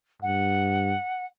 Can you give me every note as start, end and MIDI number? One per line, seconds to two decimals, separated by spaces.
0.22 0.96 43
0.22 1.26 78